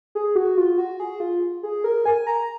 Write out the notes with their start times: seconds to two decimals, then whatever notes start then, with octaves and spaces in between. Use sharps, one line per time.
0.15 G#4
0.35 F#4
0.57 F4
0.78 F#4
1.00 G#4
1.20 F4
1.63 G#4
1.84 A#4
2.05 G#5
2.27 A#5